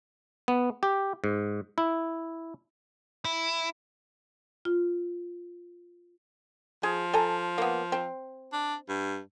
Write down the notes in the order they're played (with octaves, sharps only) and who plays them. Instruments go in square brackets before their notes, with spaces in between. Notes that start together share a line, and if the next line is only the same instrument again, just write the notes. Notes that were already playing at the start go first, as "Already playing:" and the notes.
[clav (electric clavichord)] B3
G4
G#2
E4
[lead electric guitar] E4
[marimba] F4
[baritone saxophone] F3 [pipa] G#4
[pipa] A4 G#5 A#5
A#3 B3
C4
[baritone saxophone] D4
G2